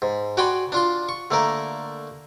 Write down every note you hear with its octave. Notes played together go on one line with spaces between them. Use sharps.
G#2
F#4 D5 G5 G#5 B5 C6
D4 F4 C6
C#6
D3 A3 A#3 A#4